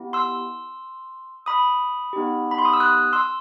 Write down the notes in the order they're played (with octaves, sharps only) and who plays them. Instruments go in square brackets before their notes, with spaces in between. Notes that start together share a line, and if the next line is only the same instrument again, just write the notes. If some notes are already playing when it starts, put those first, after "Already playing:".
Already playing: [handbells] B3 E4 G4
C6 E6
B5 D#6
B3 D#4 G4
B5
C6
D#6
E6
D#6 F#6
C6 E6